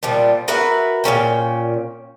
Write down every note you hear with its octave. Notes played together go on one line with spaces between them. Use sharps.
A#2 F3 G3
F#4 A#4 B4 E5
A#2 C#3 C#4 G5